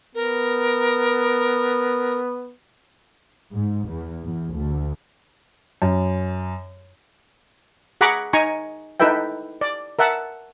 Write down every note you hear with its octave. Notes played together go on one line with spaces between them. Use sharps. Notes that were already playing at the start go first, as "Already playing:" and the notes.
B3 A#4
G#2
E2
E2
D2
F#2
G#4 F#5 A#5 B5 C#6 D6
D#4 G#5 A#5 C#6
D#4 E4 A4 B4 E5 G5
D5
A#4 E5 F#5 A5